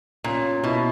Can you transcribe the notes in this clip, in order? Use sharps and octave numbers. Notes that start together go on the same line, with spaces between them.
A#2 C#4
B2 E4